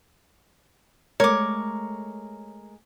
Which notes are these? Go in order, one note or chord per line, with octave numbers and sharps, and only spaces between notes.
G#3 A3 A#4 C#5 D6